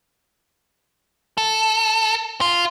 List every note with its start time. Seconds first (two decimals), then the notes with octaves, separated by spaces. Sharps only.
1.38 A4
2.41 F4